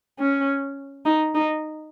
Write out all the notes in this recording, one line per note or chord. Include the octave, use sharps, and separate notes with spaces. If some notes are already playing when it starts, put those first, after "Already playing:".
C#4
D#4
D#4